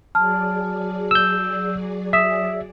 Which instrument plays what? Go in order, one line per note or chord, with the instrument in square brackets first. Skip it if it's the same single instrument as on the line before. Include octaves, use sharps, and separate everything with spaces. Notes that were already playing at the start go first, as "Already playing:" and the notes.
[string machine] F#3 G#4 D5 [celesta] A5 F6
[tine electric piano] E6 G6
[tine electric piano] E5 [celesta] D#6 B6 E7